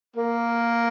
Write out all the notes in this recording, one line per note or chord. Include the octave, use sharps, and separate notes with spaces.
A#3